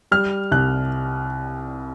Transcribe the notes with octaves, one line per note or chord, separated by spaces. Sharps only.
G3 F6
C2 F#6